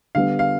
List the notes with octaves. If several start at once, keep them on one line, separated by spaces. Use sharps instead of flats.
D3 G3 B3 F5
F5